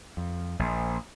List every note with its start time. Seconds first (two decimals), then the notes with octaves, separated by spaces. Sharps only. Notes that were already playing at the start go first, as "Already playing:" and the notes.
0.17 F2
0.59 A#1